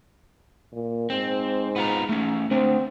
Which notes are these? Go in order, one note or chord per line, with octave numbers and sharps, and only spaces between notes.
A#2
G#2 C4
B3 F4 A#5
A3 C#4
A3 C4 D4